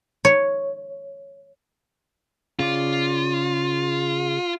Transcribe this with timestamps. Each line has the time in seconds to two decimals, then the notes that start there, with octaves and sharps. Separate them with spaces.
0.25 C#5
2.59 C#3 F4 D5